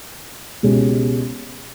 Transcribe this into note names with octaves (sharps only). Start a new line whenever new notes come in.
C#2 B2 G#3 C#4 G4